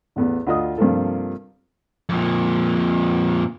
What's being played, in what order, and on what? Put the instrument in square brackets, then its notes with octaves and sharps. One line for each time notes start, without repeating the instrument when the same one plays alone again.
[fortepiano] A1 E2 B3
D2 F4 D#5 D#6
G2 C3 F3 A#3 F4 A4
[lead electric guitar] F2 A#2